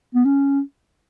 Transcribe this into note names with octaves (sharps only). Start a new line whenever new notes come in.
B3
C#4